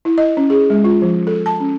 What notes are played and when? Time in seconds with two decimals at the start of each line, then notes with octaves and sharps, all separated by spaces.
0.05 E4
0.18 D#5
0.37 C#4
0.50 G#4
0.70 G#3
0.84 F4
1.02 F3
1.27 A4
1.46 A5
1.60 C#4